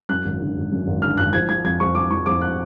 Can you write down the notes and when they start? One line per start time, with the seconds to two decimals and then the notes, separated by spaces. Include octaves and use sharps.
0.09 F#2 F#6
0.25 G#1
0.41 D3
0.57 G#1
0.72 F#2
0.87 G#1
1.02 D3 F6
1.17 G#1 F#6
1.33 F3 G#6
1.49 F3 G#6
1.64 F2 G#6
1.80 F2 C#6
1.95 F3 D6
2.11 F3 C#6
2.26 F2 D6
2.41 F#6